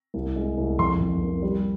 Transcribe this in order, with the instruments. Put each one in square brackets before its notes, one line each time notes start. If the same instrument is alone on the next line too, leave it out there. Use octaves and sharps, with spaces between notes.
[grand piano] C2
G#3
C2
F2 C6
F2
A#3
G3